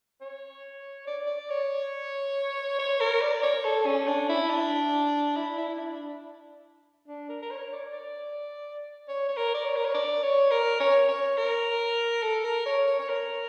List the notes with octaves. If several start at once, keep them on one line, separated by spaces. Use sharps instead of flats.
C#5
D5
D5
C#5
C#5
A#4
D5
C#5
A4
C#4
D4
E4
D4
E4
E4
E4
D4
D4
A#4
A#4
C#5
D5
D5
C#5
C#5
A#4
D5
C#5
A#4
C#5
D5
C#5
A#4
C#5
C#5
A#4
A4
A#4
C#5
C#5
C#5
A#4